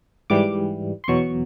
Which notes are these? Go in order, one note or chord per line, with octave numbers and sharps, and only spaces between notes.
G#2 E3 G3 D6
C6
E2 B2 F#3 C#6